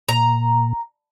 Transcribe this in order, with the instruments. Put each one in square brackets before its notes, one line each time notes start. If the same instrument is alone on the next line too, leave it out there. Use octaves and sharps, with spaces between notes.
[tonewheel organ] A#2 [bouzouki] A#5